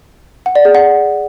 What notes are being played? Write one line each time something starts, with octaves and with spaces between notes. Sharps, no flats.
F#5
D5
G#4
F#5